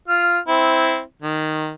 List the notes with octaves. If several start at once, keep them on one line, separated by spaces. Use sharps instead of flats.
F4 F6
C4 E4
D#3